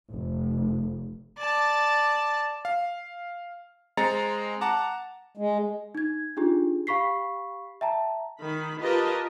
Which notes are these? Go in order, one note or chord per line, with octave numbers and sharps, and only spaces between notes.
F1
D5 A5
F5
G#3 C4 A#5 A6 C#7
F#5 A5 A#5 D6
G#3
D#4 G#6
D4 D#4 F4 G4 G#4
G4 F5 B5 C#6 B6 C7
E5 G5 A5 A#5
D#3 B5
F4 G4 A#4 B4 D#5 A5